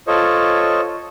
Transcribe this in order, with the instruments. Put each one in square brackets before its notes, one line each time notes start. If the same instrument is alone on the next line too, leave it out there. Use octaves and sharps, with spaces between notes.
[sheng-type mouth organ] F4 A4 C5 C#5 D#5 C#6